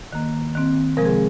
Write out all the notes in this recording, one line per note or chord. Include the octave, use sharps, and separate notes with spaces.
D#3 A#3
D#3 C4
C3 F3 G#3 C4 A#4
G#4